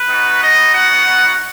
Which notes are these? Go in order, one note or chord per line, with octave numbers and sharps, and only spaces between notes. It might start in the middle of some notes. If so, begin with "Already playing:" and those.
Already playing: B4
B3 D#4 F#4
D#5
F#5